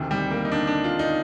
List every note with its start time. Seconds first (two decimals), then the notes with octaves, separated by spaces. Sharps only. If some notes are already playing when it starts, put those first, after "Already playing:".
Already playing: D2 C3 D#3
0.11 G3
0.31 A#3
0.45 D#4
0.52 D4
0.67 D4
0.84 F4
0.99 D#4